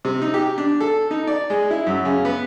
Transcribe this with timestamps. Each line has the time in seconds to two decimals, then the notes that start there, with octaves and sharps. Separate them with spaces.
0.05 C3
0.22 D#4
0.34 G4
0.58 D4
0.81 A4
1.11 D#4
1.27 D5
1.50 G#3
1.71 E4
1.87 F#2
2.05 C#3
2.25 B3